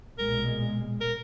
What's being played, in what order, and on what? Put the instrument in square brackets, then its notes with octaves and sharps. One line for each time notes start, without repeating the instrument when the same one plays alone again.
[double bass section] B1 A#2 G#3 [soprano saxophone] A#4
[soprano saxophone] A#4